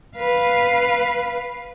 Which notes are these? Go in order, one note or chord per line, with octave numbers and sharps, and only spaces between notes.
B4 F5